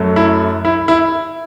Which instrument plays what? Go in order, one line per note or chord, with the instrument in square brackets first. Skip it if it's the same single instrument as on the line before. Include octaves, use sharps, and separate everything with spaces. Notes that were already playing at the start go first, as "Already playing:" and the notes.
Already playing: [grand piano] F#2 F#3 A3
E4
E4
E4